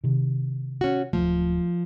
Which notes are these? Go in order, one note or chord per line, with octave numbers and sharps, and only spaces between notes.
C3 D#3
C#4 F#4
D1 E2 F3 A3